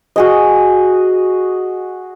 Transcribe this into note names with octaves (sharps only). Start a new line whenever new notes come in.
F#4 G#4 D#5